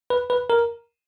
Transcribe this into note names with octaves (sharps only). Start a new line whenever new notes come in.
B4
B4
A#4